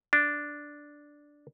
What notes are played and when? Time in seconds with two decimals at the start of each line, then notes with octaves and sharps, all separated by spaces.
0.13 D4